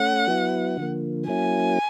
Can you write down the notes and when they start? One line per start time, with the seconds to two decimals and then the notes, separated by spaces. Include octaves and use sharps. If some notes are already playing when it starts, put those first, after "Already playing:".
Already playing: A3 C#4 F#5
0.27 F#3 B3 E4
0.77 D3 F3 A#3
1.28 F#3 A#3 C#4 E4 G#5